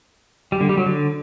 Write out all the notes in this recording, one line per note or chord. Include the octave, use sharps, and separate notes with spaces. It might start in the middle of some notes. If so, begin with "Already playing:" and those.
G3
D3
G3
F#3
D3